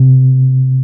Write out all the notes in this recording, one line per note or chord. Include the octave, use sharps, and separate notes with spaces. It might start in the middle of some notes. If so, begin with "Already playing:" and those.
Already playing: C3